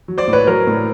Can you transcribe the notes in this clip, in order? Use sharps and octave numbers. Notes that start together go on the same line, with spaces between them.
F#3
C5 D5
A2
B4 C#5
F#3 A#4 C5
A2